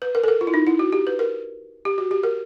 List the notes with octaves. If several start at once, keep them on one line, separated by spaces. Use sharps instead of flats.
B4
A#4
A4
A#4
F4
E4
D#4
E4
F#4
G4
B4
A#4
G4
F#4
G4
A#4